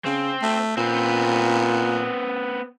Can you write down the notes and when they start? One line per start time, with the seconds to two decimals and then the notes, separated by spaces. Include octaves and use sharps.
0.05 C#3 C4
0.42 A3
0.77 A#2 B3 C4